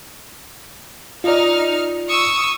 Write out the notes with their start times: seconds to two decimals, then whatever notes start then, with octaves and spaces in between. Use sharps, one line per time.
1.24 D#4 F4 D5 F6
2.08 C#6 D#6 E6